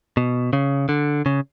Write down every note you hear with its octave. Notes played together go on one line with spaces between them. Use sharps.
B2
C#3
D3
C#3